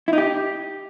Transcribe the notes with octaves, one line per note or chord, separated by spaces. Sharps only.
E4
D#4
G4